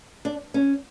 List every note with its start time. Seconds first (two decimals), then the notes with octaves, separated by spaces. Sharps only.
0.25 D4
0.54 C#4